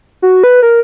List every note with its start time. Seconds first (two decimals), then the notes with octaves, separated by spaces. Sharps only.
0.22 F#4
0.44 B4
0.63 A#4